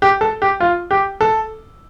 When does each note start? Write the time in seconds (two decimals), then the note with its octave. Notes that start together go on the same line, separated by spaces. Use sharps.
0.02 G4
0.21 A4
0.42 G4
0.60 F4
0.91 G4
1.21 A4